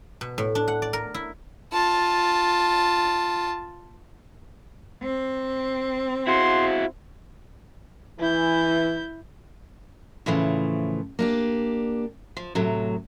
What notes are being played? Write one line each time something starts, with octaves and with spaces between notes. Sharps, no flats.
B2
A2
D4
F#5
D5
A#4
E4
F4 A5
C4
E4 F#4 C6
E3 E4 G6
A2 C#3 E3 F3
A#3 D4 G4
F3
A2 C3 F#3